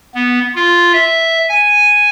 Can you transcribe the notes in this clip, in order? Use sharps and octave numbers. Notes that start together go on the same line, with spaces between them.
B3
F4
E5
G#5